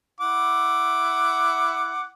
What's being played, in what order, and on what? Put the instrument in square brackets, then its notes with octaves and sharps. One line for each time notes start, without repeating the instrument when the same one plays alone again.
[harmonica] E4 F#5 D6